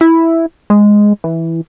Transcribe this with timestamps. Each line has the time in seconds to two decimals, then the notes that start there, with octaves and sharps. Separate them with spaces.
0.01 E4
0.70 G#3
1.24 E3